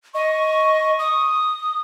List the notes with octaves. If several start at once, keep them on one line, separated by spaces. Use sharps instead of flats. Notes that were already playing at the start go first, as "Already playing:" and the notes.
D#5 C#6
D#6